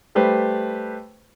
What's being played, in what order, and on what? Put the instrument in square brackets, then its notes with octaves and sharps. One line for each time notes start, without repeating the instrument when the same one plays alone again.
[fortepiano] G3 A3 G4 B4 C5